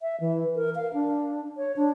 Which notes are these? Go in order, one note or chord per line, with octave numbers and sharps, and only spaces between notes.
E5
E3
A#4
F5
D4
C#5
D4